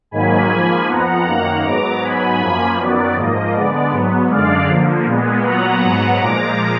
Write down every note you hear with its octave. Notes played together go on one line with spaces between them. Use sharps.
G#2 D#3 F#3 A#3 G#5 B5
G#2 F3 A#3
F2 F3 B3 F#5 A#5
F#2 D#3 A#3
G#2 F#3 B3 A#5 D6
G#2 F#3 B3 G#5 B5
F#2 F3 A#3
F#2 D#3 F#3 B3 D5
G#2 F3 A#3 D#5
D3 G#3 B3 D5
G#2 F#3 B3
F#2 D3 G#3 D5 F5
D3 F3 A#3
A#2 G#3 B3
A#2 F#3 B3 F#5 A#5
G#2 F#3 B3
A#2 F3 G#3 A#5 D6